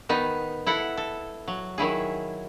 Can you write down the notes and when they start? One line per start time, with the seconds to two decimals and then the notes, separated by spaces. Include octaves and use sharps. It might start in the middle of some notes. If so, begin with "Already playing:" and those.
0.09 D#3 B3 D#4
0.66 E4 A4 F#5
0.97 A4
1.48 F#3
1.78 D#3 F#3 E4 G#4